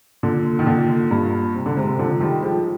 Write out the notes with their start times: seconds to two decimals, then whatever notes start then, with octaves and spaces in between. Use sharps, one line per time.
0.23 A#2 D3
0.59 D#3
0.66 A#2 D3
1.11 G2 A#2
1.55 C3
1.66 D3
1.77 G#2 C3
1.99 D3 F3
2.20 D#3 G3
2.43 F3 G#3